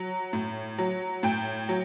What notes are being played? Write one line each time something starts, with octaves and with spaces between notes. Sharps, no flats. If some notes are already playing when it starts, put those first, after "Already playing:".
Already playing: F#3
A2
F#3
A2 G5
F#3